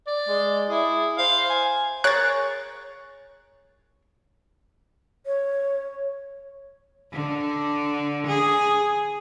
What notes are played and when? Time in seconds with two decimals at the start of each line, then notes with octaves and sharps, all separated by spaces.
0.07 D5
0.28 G#3
0.69 E4 G#4
1.18 C5 F5
1.50 G#5
2.04 G#4 A#4 C#5 F#6 A6
5.26 C#5
7.13 D3
8.27 G#4